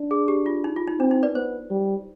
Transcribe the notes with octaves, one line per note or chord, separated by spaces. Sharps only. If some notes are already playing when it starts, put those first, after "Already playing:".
Already playing: D4
G#4
G4
F4
D#4
F4
D#4
C4 D4
D#4
B4 D5
B3 C5
G3